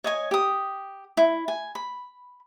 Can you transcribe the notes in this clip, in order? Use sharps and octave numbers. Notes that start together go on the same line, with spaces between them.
C#5 D#5 G#5
G4 D#6
E4
G#5
B5